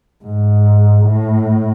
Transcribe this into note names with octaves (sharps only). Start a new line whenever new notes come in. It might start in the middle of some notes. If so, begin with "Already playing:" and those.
G#2
A2